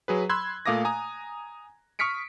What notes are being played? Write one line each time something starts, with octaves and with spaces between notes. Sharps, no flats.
F#3 G#4 B4
B5 C6 E6 F#6 G#6
A#2 A3 F5 D6 D#6 A#6
G#5 A#5 D#6
C#6 D#6 F6 B6 C#7 D7